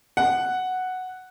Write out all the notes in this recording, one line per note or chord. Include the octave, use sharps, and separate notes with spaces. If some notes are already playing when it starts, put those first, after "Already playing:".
F#5